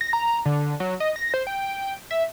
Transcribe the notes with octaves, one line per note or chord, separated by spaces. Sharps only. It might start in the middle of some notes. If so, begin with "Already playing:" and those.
A#6
A#5
D3
F#3
D#5
A#6
C5
G5
E5